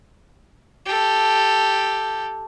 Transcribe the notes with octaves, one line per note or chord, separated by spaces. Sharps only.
G4 A4